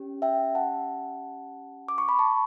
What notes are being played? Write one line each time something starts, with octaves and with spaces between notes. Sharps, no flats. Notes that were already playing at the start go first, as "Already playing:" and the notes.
Already playing: C#4 G4
E5 G5
F#5 A5
D6
C#6
B5
A5 C#6